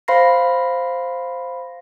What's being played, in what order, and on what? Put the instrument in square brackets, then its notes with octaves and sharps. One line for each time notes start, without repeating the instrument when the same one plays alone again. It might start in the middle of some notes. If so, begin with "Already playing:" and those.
[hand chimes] C5 F5 B5 C6 A#6 C7